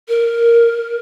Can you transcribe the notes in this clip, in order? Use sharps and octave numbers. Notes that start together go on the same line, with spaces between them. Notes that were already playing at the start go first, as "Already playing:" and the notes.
A#4